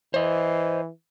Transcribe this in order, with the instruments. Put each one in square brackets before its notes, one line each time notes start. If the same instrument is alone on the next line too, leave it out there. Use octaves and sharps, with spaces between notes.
[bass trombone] E3 [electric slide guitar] C5 D#5